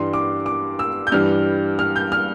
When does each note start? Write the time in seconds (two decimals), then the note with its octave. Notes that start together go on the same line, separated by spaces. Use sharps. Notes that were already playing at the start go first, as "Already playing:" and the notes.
Already playing: G2 E3 G3 C6
0.13 D6
0.46 D6
0.79 E6
1.07 G6
1.12 G2 E3 G3 F6
1.79 F6
1.96 G6
2.12 F6